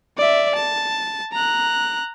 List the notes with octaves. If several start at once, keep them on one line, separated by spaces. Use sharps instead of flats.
D5 E5
A5
A#5 F#6